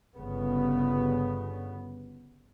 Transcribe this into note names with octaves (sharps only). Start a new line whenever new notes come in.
G1 C#3 B3